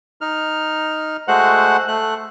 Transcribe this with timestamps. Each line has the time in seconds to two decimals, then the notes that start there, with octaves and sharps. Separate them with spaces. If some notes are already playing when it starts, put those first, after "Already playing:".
0.21 D#4 F6
1.28 G#3 A3 F#4 C5 F#5 F#6
1.88 A3 F#6